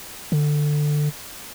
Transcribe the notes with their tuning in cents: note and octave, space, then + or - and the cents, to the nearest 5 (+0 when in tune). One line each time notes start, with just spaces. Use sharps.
D3 +15